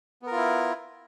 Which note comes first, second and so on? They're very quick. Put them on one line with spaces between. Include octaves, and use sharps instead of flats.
B3 A#4 F4 E4